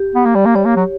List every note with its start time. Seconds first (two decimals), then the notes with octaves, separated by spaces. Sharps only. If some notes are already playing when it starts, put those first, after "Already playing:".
Already playing: G4
0.15 B3
0.25 A#3
0.35 G3
0.46 A#3
0.55 G3 C#5
0.65 A#3
0.76 F#3